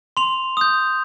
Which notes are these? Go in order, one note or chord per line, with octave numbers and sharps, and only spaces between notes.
C6 F7
D#6 G6